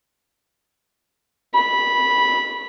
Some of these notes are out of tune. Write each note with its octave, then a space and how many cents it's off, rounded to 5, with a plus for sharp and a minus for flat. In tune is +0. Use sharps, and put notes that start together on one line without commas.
B5 -10